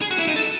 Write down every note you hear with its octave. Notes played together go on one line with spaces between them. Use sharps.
G#4
F#4
E4
D#4
A4